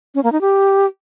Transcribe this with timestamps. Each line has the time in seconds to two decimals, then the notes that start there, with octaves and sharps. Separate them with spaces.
0.15 C#4
0.23 A#3
0.32 D#4
0.41 G4